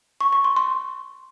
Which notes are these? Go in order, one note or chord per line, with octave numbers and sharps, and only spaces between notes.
C#6
C#6
C6
C6